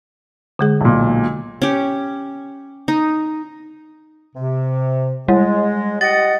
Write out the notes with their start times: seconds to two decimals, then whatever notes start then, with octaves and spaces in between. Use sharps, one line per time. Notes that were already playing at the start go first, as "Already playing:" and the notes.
0.59 D3 G#3 G#4
0.81 B1 A#2
1.62 C#4 G4
2.88 D#4
4.35 C3
5.28 G3 G#3
6.01 G4 D#5 F#5 A6